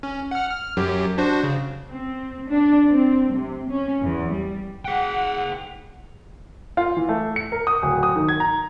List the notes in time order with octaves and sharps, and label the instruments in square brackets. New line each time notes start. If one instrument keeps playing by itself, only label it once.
[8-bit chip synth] C#4
F#5 F6
F6
F#2 F#3 G4
D4 F#4 C5
C#3
[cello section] C4
D4
C4
C3
C#4
E2
G3
[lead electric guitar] G#4 G5 [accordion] F#5
[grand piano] F4
E3
A3
C#7
A#4
D#6
D1
D#6
D#3
G#6
A#5